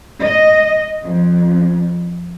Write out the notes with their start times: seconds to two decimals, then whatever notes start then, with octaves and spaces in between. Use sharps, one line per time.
0.24 D#5
1.05 F2